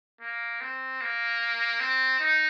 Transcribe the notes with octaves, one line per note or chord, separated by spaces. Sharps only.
A#3
C4
A#3
C4
D#4